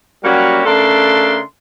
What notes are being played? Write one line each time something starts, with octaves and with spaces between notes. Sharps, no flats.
F#3 G3 A#3 C#4 F#4 G4
C#3 A3 D4 A4 A#4 C6